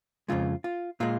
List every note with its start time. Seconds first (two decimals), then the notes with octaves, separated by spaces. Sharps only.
0.28 F2 C#3 G#3 F4
0.64 F4
1.00 A#2 G#3 F4